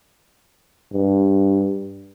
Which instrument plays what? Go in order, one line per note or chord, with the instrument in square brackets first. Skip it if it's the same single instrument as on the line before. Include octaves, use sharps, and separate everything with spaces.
[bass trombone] G2